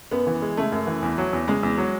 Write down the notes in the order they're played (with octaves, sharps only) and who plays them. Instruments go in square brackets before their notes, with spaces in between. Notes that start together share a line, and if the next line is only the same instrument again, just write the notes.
[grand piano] F#2 [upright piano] B3
[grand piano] E3
G#3
[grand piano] C#3 [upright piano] A3
[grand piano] F#2
E3
E2
F#3
E2
[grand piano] C#3 [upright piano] G#3
[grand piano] E2
F#3